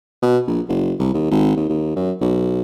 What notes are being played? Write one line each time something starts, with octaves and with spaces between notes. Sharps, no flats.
B2
A#1
F#1
C2
D#2
G#1
D#2
D#2
F#2
B1